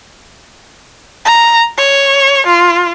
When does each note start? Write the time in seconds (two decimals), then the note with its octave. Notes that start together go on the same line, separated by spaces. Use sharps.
1.25 A#5
1.77 C#5
2.46 F4